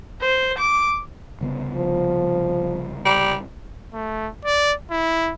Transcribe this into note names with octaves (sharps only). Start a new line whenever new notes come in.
C5
D6
C2 C#3 B3
F3
G3
A3
D5
E4